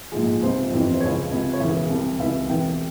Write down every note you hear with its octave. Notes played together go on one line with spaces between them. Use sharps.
A#1 G#2 F3 G#4
C#2 C3 F3 C5
G1 F2 C3 E3
C5
C#2 C#3 F3 C#5
C#2 C3 F3
C#5
E1 E2 C#3 E3 E5
C2 C3 E3
C#2 C3 E3 E5
E1 E2 C3 E3 G5